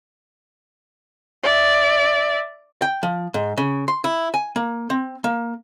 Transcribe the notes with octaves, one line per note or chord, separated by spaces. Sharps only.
D5 E5
G5
F3
G#2
C#3
C6
E4
G#5
A#3
C4
A#3